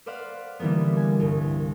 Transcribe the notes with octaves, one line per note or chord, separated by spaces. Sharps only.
B4 C5 D5 F5 F#5
D3 E3 G3 A#3 B3
G#5
C2 G2